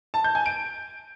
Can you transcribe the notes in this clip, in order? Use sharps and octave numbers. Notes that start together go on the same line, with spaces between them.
A5
G6
G#5
D7